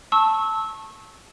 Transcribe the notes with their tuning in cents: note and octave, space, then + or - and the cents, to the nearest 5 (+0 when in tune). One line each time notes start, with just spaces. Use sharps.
A5 +0 C#6 -25 E6 -20